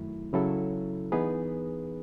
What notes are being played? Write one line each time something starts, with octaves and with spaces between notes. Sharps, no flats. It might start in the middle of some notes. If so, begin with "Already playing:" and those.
Already playing: F#2 D#3 F#3 A3 E4
C#3 F#3 C#4 E4 A4
E3 B3 D#4 G#4 B4